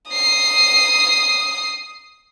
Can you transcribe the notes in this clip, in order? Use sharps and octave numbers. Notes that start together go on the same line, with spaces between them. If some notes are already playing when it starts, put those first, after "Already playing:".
D#6 C7